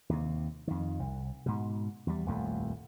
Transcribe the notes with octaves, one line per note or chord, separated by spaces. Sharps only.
D#2 C3
F2 D#3
C2
G#2 B2
E2 G3
D#1 C2 F2 A3